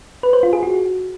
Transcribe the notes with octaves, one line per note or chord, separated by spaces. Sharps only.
B4
C5
F4
G#4
F#4